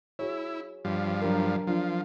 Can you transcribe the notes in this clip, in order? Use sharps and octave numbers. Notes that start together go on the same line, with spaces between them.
E4 F#4 G#4 C#5
G2 F3
F#3 D4 A#4
F3 F#3 D4 F4